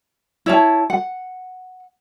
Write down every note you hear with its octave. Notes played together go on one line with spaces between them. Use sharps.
E4 C#5 A5
F#5